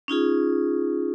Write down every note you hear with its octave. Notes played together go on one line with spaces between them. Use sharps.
C#4 D#4 F4 G#4